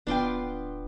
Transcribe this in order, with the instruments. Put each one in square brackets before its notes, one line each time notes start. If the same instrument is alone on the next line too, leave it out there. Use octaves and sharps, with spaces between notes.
[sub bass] D1 [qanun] B3 C6 D6 [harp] D4 F4 G5